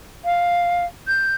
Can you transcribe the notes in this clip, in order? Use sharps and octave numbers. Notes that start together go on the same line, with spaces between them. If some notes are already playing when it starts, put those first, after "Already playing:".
F5
G6